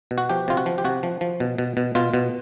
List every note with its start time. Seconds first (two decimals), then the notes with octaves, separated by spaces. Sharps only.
0.11 B2
0.18 F#4
0.29 F3 G4
0.48 C3 F4
0.57 F#4
0.66 F3
0.78 G4
0.85 C3 F#4
1.03 F3
1.21 F3
1.40 B2
1.58 B2
1.77 B2
1.95 B2 F4
2.14 B2